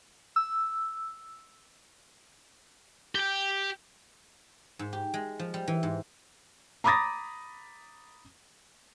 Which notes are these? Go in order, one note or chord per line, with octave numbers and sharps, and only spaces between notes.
E6
G4 G5
G#2
G4
G#3
F3
G3
E3
G#2
A#5 B5 D6 D#6 A6 A#6